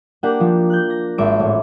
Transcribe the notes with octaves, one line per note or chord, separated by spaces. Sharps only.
A#3 D4 G4 F#5
F3
F#6 G6
A#6
G#1 E5 D6 D7
A1